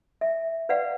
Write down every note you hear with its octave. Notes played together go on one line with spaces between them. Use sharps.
E5
B4 D5 F5 F#5